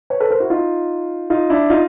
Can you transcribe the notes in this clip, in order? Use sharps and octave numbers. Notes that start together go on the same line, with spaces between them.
B4 C#5
A4 B4
A#4 C5
E4 F#4
D#4 F4
D#4 F4
D4 E4
D#4 F4